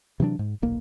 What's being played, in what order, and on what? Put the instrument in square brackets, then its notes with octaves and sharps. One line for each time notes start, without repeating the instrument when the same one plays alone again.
[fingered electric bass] C3 E3 F#3 D4
G#2
D#1 B1 A#3